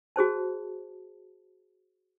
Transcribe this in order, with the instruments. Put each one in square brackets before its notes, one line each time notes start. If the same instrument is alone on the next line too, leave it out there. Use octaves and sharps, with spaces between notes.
[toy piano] F#4 G#4 C5 A5